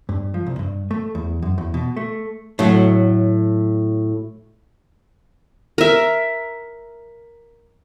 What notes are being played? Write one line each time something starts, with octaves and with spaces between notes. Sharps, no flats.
G2
F3
C2
G2
A3
E2
F#2
E2
B2
A3
A2 F#3
A#4 E5